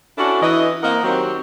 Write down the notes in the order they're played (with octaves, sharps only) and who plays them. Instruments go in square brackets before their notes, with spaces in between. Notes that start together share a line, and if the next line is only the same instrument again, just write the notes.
[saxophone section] C#4 D4 E4 F#4 A4 D5
E3 D#5
A#3 C4 A#4 D#5 F#5
D#3 F#3 C4 F#4 G4